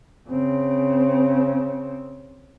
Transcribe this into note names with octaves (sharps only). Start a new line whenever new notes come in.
C#3 C4